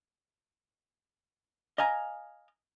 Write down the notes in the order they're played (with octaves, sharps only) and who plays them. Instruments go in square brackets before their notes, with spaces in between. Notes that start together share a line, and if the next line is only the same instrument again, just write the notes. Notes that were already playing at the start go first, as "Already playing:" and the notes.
[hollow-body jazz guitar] D#5 F5 G#5 A#5